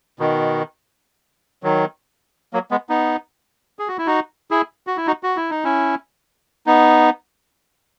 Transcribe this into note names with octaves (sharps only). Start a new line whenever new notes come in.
B2 D#3
D#3 F#3
F#3 A#3
G#3 B3
B3 D#4
G#4
F#4
E4
D#4 F#4
E4 G#4
F#4
E4
D#4 F#4
F#4
E4
D#4
C#4 E4
B3 D#4